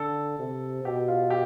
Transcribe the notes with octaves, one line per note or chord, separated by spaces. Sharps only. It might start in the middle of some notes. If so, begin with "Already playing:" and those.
Already playing: D3 A4
C3
B2 G4
F4
G4